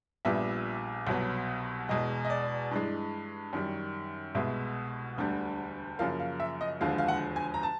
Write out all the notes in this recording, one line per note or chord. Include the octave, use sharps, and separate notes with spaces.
A#1 A#2 G3 B3 E5
C2 B2 F#3 B3
E2 B2 G#3 D#5
D#5
D5
G2 E3 G#3
F#2 D#3 G3
C2 B2 G#3 B3 E5
E1 D2 D3 G3
F#2 C#3 F3 A#3 F5
F5
E5
D#5
E1 D#2 D3 F3 G#3 F5
F5
F#5
G#5
A#5
A5